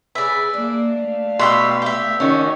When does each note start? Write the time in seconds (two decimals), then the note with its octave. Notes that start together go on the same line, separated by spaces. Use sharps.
0.15 C#3 G#4 B4 D5 E5
0.54 A#3 D4
0.99 A3 F5
1.39 B2 G4 E5 C6
1.82 G4 E5
2.20 D#3 C#4 D#4 F#4